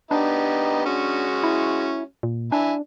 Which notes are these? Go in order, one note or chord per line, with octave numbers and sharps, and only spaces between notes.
B3 D4 D#4 G4
G#3 C#4 F#4
E4
A#2
D4 E4 G#5